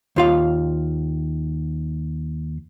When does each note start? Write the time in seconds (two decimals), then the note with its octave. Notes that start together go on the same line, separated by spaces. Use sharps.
0.16 D#2 F4 F5